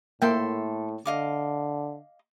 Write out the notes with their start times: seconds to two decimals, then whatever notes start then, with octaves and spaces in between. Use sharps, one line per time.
0.22 A2 A#3 A4 E5 G5 C6
1.06 D3 D#5 F5 D6